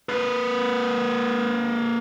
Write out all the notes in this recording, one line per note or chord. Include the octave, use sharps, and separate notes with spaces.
A#3 B4